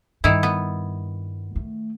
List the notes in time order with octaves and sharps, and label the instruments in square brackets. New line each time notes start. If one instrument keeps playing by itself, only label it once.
[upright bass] G2 [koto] D#3 E4
[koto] B3
[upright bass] A3